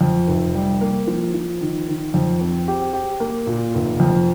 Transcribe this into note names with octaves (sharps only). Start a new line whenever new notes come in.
F2
F1
G3
A#3
F3
F3
D#3
D#3
F2
C4
G4
G4
A#3
A#2
F1
F2